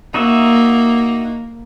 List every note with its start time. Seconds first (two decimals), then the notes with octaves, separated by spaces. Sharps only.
0.14 A#3 D#4 F#4 E5